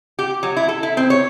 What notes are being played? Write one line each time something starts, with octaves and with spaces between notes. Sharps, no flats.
G4
F#3
E4
A4
E4
C4
C#5